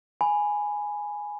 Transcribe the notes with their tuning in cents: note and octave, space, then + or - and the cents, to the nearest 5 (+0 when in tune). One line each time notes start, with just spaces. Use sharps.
G#5 +0 B5 +0